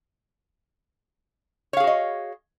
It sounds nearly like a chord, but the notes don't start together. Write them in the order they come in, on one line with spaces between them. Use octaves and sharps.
C#5 F5 G#4 F#4 D#5